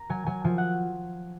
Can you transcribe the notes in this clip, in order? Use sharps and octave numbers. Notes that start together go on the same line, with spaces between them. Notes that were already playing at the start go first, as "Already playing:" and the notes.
Already playing: A#5
F#3 G#5
F#3 G#5
F3 G#5
F#5